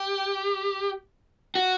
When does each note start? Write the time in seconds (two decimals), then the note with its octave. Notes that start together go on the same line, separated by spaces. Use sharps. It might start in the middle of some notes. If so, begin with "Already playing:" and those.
Already playing: G4
1.55 F#4